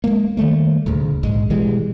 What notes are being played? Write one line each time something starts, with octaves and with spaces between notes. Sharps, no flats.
G#3 A#3
D#3 G3 A3 A#3
D#1 D2 C#3
A#1 G#2 G#3
B2 E3 G3 G#3